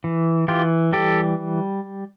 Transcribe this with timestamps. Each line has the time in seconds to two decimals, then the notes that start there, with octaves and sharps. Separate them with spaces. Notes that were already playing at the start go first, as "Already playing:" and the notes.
0.04 E3
0.48 E3 F4 G4
0.93 G3 G4 A4